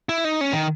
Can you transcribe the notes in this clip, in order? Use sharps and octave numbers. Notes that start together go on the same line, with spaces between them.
E4
D#4
C#4
D#3